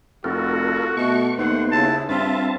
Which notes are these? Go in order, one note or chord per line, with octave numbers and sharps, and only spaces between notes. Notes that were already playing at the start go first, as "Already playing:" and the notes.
F1 F4 F#4 A4 A#4
B2 A3 C#6
D#2 B3 C5 F#5
C#3 E4 A5
G2 C4 F4 E5 A5